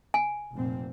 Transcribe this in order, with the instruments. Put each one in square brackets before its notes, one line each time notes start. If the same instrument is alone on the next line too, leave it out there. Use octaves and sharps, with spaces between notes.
[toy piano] G#5
[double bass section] F1 A#2 C4